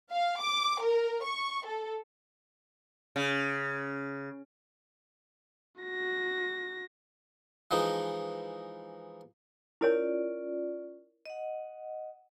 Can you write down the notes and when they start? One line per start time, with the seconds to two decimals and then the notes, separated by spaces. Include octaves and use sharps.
0.12 F5
0.42 D6
0.83 A#4
1.25 C#6
1.66 A4
3.16 C#3
5.82 F#4 A#6
7.71 E3 F3 G#3 D#4
9.81 C#4 E4 F4 A#4 C#5 D5
11.26 D#5 F#5